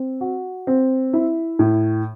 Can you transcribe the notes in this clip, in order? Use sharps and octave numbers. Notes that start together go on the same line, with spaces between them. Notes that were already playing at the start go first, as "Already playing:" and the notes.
Already playing: C4
F#4
C4
E4
A2